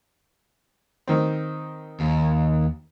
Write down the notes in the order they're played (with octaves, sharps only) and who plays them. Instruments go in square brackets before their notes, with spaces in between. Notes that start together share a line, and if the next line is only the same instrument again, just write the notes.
[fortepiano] D#3 C4
[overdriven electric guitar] D#2